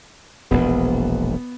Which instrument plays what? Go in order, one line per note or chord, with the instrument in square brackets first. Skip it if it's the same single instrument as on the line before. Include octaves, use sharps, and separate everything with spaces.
[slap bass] E1 A#1 [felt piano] B3